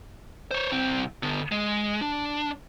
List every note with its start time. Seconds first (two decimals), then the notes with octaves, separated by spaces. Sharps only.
0.51 C5 C#5
0.72 C2 C4
1.23 D3 B3
1.52 G#3
2.01 D4